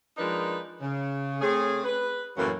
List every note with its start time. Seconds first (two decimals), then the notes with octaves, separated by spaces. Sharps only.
0.18 F3 G#3 D4 D#4 A#4 B4
0.81 C#3
1.41 A3 C4 C#4 G#4
1.84 B4
2.37 F#2 A2 E3 F#3 A#3